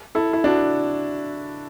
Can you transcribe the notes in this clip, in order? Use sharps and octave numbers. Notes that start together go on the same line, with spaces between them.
E4 A4
E4
D4 F#4